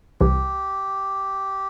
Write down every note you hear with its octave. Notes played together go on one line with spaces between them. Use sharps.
C2 C3 E3 G4